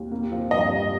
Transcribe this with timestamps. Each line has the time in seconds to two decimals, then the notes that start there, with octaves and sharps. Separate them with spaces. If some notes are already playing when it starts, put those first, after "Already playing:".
Already playing: D#2
0.11 A#3
0.32 F3
0.51 G2 D#5
0.72 G2